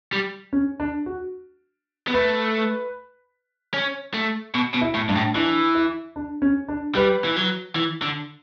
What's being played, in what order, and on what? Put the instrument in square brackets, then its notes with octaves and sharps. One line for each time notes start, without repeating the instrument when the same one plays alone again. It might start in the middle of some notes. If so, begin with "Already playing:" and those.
[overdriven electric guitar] G3
[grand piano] C#4
D4
F#4
[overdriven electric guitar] B3
[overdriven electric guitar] A3 [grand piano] B4
[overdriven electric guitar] C#4
A3
B2
B2
[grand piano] E4
[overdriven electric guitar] A2
[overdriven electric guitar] G2 [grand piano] D4
[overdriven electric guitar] A2
[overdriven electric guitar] E3 [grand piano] D4
[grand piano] E4
D4
C#4
D4
[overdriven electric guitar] G3 [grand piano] B4
[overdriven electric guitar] E3
F#3
E3
D3